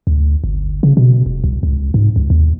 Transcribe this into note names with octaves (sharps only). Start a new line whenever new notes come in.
D2
G1
C#3
B2
E1
C2
C#2
G#2
C#2
D#2